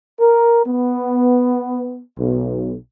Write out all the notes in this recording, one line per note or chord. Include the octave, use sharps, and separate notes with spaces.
A#4
B3
B1